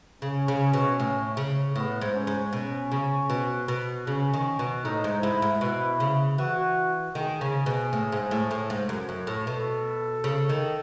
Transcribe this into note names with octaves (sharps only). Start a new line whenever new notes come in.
C#3 C#4
C#3
B2
A2
C#3
A2 B3
G#2
C#4
G#2
B2 C#4
C#3
B2
B2
C#3 C#4
D#3
B2
A2 D#4
G#2
G#2 E4
G#2
B2 E4
C#3
E3 F#4
D#3 G#4
C#3
B2
A2
G#2
A2
A2
G#2
F#2
F#2
A2
B2 A4
C#3
D#3